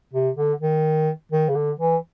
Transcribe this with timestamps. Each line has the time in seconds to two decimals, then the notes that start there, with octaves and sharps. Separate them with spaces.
0.13 C3
0.37 D3
0.61 D#3
1.32 D#3
1.49 C#3
1.55 D3
1.80 E3